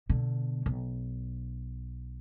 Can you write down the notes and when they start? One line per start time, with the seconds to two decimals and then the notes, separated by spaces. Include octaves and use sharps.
0.09 B2 D3
0.66 B1